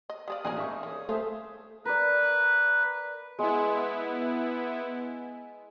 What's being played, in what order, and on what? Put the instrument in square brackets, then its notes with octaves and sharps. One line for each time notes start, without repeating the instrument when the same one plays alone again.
[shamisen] D#5
[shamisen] G3 G#4 D5 [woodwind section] F5 D#6
[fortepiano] A1 A#2 G#5 [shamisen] D4 G#4 A#4
[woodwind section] C2 G#3 D#4 [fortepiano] E5 C#6
[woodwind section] C2 C#5 D#6 [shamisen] C#3
[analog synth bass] A3 [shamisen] F4 [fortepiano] G#4 C5 E5
[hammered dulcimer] A#4 D5 [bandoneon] B4
[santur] G#3 [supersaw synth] B3 E4